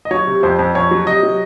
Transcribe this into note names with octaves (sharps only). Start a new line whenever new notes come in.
D#5
F#3 C#5
C3
F2 C5
F2
F2 C#5
F#3
C3 D#5
F#3